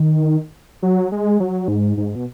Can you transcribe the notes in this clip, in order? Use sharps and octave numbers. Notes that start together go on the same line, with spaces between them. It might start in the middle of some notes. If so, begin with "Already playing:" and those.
Already playing: D#3
F#3
G#3
F#3
G#2
G#2
B2